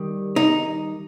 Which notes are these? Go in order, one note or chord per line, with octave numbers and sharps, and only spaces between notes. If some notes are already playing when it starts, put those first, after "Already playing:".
Already playing: D#3 G3
D#4